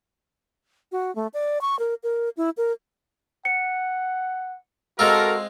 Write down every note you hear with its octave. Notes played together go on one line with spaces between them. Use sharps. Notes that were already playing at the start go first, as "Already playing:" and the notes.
F#4
A3
D5
C#6
A#4
A#4
E4
A#4
F#5 C#7
G#3 C4 F4 F#4 A4 A#4 E6